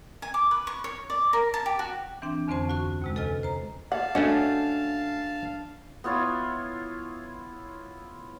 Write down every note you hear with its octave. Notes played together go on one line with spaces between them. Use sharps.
G#5
D6
B4
C#6
C#5
D5
A#4
A5
G4
F#4
E3 C4 D4 G5
F2 D3 C4 C#4 C5 A5
D2 F#4 C#6
D#2 C3 G#3
C3 A4 B4 D#5 G#5 F6
C5 A#5
F5 F#5 A5
A3 C#4 D4 F#4 D#5
B3 E4 F4 C#5